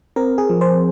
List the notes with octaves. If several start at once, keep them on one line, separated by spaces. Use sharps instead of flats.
C4 A#4
G#4
F3
C5